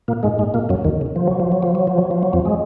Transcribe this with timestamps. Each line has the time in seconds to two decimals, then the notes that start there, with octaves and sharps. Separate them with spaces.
0.08 A#2 A#3
0.23 G#2 G#3
0.38 G#2 G#3
0.54 A#2 A#3
0.69 F#2 F#3
0.85 D#2 D#3
1.01 C#3
1.16 F3
1.28 F#3
1.40 F3
1.52 F#3
1.63 F3
1.75 F#3
1.87 F3
1.98 F#3
2.11 F3
2.23 F#3
2.33 F2 F3
2.45 G#3